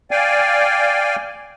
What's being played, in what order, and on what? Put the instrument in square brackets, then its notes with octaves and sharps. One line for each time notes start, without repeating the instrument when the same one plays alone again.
[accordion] D5 F5 G5 G#5